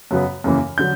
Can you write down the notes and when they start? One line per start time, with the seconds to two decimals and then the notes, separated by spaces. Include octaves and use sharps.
0.11 F#2 C#3 F#3 B3
0.44 F#2 C#3 E3 A#3
0.78 D3 F#3 G6